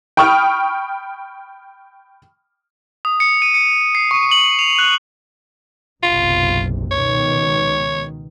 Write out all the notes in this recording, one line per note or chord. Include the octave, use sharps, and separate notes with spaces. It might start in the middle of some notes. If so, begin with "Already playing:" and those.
G5 B5 C#6 D#6 F6
D#6
C#7
D#7
C#7
C7
C#6
F#7
F7
F#6
F#1 B1 C3 F4
C#2 B2 D#3 C#5